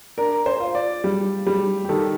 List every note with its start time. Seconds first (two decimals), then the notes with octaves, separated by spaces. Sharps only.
0.18 D4 A#4
0.46 C5
0.60 F4
0.75 D5
1.04 G3
1.47 G3
1.85 G4
1.89 D#3 A4